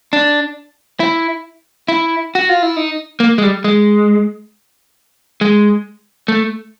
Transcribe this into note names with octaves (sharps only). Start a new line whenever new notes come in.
D4
E4
E4
F#4
F4
E4
D#4
A#3
G#3
G3
G#3
G#3
A3